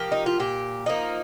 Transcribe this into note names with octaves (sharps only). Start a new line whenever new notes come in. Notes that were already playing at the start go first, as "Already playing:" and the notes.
Already playing: F3 A#3 G4
D#4
F4
A#2 G4
F3 A#3 D#4